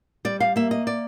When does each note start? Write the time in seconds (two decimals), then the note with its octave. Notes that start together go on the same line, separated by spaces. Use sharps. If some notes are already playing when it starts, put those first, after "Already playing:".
0.25 G3 D5
0.40 F5
0.56 A#3 E5
0.71 D#5
0.87 D5